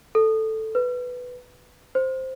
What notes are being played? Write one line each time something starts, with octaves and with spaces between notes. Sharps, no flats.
A4
B4
C5